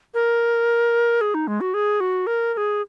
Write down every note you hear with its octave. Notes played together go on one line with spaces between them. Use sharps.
A#4
G#4
D#4
G#3
F#4
G#4
F#4
A#4
A#4
G#4